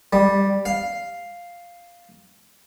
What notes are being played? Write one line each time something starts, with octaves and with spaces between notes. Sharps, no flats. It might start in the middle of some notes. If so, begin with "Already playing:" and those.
G3
F5